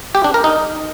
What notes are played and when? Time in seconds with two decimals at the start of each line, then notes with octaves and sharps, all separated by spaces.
0.15 G4
0.24 D4
0.34 A#4
0.44 D#4